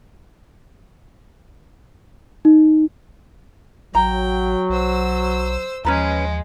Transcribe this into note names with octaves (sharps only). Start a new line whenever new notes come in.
D#4
A1 F#3 G5 A#5
B1 C5 E6
D#2 F3 G#3 C#4 B4 A#5